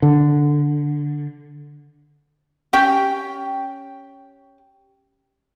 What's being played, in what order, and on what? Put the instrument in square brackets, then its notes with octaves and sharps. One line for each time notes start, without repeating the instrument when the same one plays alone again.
[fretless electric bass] D3
[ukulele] C#4 G4 G5